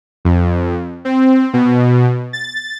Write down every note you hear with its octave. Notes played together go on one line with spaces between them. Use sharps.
F2
C4
B2
A6